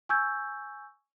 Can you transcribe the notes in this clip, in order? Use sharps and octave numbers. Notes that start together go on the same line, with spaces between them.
G#5 C#6 E6 G6 G#6